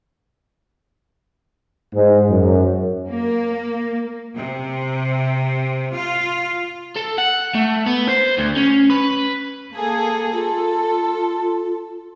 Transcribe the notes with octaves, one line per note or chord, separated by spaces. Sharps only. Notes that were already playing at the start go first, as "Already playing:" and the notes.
G#2
F#2
A#3
C3
F4
A4
F#5
A3
B3
C5
D2
C#4
B4
A#3 G#4 A4
F4 A4